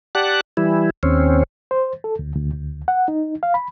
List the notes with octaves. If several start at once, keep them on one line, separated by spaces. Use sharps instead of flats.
G4 D5 F#5 A5 F#6
E3 G3 E4
D#2 C4 C#4
C5
A4
D2
D2
D2
F#5
D#4
F5
B5